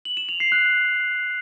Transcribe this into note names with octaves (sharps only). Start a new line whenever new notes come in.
F#7
E7
F7
C7
F#6